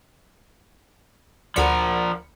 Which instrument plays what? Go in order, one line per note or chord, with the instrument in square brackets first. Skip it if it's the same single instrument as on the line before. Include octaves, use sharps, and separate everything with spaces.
[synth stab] D2 B5 C#7 [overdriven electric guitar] F3 A#4 [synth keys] D5 F#5